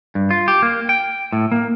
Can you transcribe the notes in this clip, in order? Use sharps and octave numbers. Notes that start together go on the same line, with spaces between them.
G2
F4
G4
A#3
G5
A2
A#3